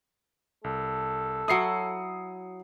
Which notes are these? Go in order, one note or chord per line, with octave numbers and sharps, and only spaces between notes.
C2 A4
F#3 E4 D#6 C7 C#7